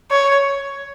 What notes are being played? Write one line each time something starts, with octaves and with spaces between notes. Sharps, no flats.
C#5